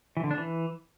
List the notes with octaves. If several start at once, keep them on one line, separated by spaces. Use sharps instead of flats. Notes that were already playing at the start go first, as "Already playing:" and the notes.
E3
D3
D4
E3